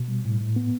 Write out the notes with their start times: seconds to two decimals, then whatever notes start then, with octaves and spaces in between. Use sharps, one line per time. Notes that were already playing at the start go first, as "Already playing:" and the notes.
Already playing: B2
0.08 G3
0.25 A2
0.40 A2
0.56 B3